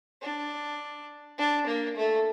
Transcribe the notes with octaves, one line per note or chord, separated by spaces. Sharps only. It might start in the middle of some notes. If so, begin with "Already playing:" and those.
D4
D4
A#3
A3